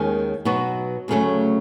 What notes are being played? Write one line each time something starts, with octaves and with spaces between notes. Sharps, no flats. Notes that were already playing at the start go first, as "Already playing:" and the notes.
Already playing: D#2 D#3 G#3 C#4
B2 F#3 B3 D#4 F#4
D2 C#3 F#3 A3 C#4